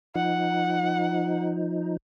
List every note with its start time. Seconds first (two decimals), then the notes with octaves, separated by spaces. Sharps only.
0.15 F3 D#4 F#5